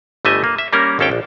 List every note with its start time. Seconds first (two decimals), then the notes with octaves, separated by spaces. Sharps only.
0.25 G1 G3 A3 D#5 E5 G#5
0.44 A#3
0.58 E5
0.73 G3 A#3 C#4 A#4
0.99 G#1 D#2 C#4 A4 F5 G5
1.11 A#1